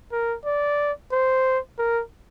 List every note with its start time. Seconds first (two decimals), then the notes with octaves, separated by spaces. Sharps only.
0.12 A#4
0.46 D5
1.12 C5
1.79 A#4